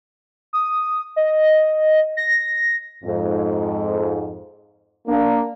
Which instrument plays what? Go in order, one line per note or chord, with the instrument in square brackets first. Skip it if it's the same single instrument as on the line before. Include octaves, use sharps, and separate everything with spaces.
[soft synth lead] D#6
D#5
A#6
[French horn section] F2 G#2
A#3 D4